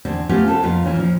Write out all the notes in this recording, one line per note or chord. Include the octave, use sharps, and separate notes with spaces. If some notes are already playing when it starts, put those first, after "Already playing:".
E2 D3 C4
A3 B3 C#4 F4 G4 A4
B3 C4 A4
F2 A#2 B3 F4
E3 C#4 D#4
A#2 F3